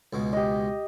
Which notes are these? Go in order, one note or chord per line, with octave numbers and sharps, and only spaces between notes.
C#2 B2 G#3
G4 D#5